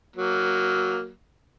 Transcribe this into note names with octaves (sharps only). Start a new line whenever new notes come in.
F#3 A#3